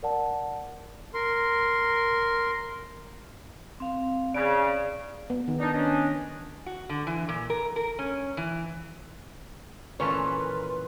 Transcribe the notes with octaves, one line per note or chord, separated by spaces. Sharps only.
A#4 D5 F#5 A5
A#4 C6
C4 F5
C#3 D5
B3
D#3
D4 D#4
C#4 D4 D#5
F#4
D3
E3
A#2
A#4
A#4
C#4
E3
A#2 E3 A3 C#4 A#4 B4 C#5 C6